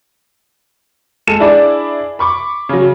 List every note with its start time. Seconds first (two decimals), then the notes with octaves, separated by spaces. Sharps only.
1.27 G#3 A4 E7
1.40 D4 E4 G#4 D5
2.19 B5 C#6 D6
2.69 C#3 F#3